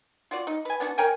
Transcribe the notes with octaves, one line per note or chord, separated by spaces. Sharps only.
F4 F#4 D5
D#4
B4 G#5
B3 D4 D#4 F#4
A#4 C#5 G5 G#5